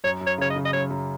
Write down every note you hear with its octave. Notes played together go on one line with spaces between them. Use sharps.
F#2 C#5
F#2
C#5
C#3 C#5
D#5
C#3
D#5
F#2 C#5
F#2